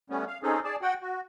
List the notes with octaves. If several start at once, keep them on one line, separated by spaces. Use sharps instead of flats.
G3 A3 B3 C#4
F5
C4 C#4 D#4 G#4 A4
G#4 D5 A5
F#4 F#5 G5
F#4